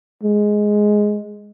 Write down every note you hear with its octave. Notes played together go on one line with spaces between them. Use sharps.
G#3